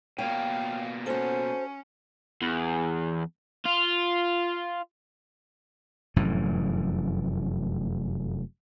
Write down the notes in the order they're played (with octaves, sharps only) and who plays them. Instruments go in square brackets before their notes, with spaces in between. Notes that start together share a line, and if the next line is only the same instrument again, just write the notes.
[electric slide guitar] B2 A#3 [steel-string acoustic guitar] C#5 G5 [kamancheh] F5
[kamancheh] C#4 [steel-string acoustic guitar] F#4 A4 [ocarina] C5
[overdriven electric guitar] E2
F4
[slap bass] F1 F#2 A2 E3